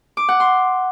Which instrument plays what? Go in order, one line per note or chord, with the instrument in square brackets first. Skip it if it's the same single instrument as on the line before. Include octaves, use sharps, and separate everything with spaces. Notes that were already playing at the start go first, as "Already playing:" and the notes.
[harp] D6
F#5
C6